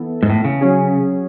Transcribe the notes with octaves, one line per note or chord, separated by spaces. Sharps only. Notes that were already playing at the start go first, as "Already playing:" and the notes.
Already playing: E3 B3 E4 A4
G#2
A2
C#3
F#3 C#4 G#4